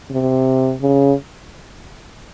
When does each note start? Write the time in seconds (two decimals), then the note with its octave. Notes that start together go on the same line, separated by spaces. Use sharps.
0.11 C3
0.82 C#3